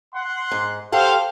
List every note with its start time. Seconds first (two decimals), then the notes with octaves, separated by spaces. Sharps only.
0.14 F#5 C6
0.51 G#2
0.92 G4 A4 C5 F5 F#5